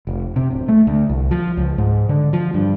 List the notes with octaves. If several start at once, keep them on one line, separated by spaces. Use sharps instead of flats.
F1
C3
D1
A3
D2
C2
F3
C#2
G#2
D3
F3
G2